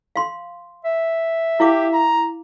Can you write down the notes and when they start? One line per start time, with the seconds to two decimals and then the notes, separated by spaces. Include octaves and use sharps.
0.16 F5 C6
0.85 E5
1.60 E4 G4 F5 D6
1.93 A#5